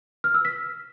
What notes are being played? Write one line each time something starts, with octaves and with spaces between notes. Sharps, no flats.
F6
E6
B6